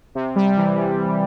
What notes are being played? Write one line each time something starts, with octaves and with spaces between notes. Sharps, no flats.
C3
G3
E3
C3